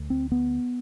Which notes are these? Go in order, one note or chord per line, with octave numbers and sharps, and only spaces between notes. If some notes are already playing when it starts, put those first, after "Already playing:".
Already playing: D2 D3
C4
B3